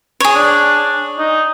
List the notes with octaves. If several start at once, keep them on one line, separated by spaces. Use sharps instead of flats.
G#4 C#5
D4
D#4